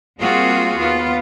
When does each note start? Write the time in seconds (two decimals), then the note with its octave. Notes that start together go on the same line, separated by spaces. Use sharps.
0.19 G3 A#3 C4 F4 F#4 G#4
0.78 D#2 B3 F4